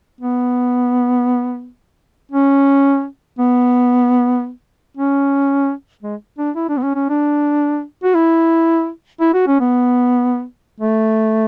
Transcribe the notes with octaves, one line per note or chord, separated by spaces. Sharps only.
B3
C#4
B3
C#4
G#3
D4
E4
D4
B3
C#4
C#4
D4
F#4
E4
E4
F#4
C#4
B3
A3